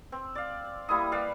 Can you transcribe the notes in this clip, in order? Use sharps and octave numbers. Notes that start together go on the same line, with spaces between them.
C4
D5 F5
G3 A#3 E4 D#6
G3 B4 D5 F5